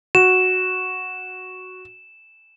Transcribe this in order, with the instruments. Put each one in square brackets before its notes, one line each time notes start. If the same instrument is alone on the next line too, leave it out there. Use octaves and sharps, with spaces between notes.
[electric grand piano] F#4 [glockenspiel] E7